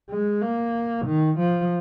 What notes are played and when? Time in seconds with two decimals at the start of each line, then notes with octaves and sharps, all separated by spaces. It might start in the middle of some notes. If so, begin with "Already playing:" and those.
0.10 G#3
0.42 A#3
1.05 D#3
1.38 F3